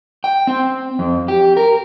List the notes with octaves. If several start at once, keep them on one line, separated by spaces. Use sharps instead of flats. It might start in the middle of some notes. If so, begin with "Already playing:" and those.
G5
C4
F2
G4
A#4